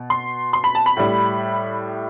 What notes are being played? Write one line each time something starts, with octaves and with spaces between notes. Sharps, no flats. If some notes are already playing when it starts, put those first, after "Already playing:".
Already playing: B2
C6
C6
B5
A5
B5
A2 G3